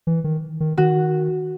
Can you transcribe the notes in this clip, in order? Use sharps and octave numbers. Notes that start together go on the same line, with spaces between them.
E3
D#3
D#3
D#3 F#4